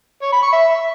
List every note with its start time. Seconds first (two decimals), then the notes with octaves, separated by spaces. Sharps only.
0.22 C#5
0.32 B5
0.42 C#6
0.52 E5